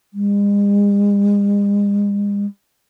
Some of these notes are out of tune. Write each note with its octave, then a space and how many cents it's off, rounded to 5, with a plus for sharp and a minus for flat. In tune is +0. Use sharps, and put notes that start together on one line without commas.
G#3 -40